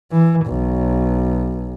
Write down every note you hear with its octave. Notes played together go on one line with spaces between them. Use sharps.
E3
B1